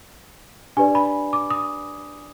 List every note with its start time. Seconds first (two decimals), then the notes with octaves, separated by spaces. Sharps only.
0.77 D4 G4 B4 D5 G#5
0.95 B5
1.33 D6
1.50 D#6